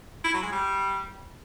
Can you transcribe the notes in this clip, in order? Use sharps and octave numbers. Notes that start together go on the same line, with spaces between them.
E4
F#3
G#3
G3